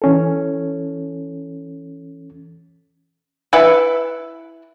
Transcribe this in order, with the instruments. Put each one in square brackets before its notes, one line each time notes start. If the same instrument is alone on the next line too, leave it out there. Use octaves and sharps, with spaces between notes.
[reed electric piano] E3 C#4 A4
[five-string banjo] E4 B4 E5 F#5